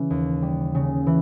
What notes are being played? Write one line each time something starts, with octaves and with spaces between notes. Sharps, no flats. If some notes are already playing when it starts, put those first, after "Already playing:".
Already playing: C#3 E3
D#2
G3
C#3
E3